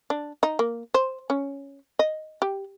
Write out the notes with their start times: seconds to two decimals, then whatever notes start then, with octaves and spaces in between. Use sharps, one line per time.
0.10 D4
0.43 D#4
0.59 A#3
0.94 C5
1.30 C#4
1.99 D#5
2.42 G4